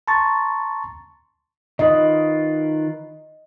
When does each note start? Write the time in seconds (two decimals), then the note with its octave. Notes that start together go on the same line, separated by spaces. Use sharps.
0.08 A5 A#5 C6 C#6 A6
1.79 D#3 F4 B4 D#5